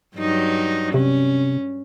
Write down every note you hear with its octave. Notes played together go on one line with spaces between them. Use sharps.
G2 F#3 D#4
C3 C#4